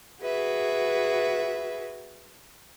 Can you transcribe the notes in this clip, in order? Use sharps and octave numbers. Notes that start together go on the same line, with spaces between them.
F#4 G#4 B4 E5